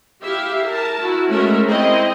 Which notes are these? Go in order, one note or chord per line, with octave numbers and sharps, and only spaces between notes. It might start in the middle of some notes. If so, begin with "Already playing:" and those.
E4 G4 E5 F5
A#4 A5
E4 F#4
G#3 A3 C#4 F#4 A#4 E5
C4 E4 D#5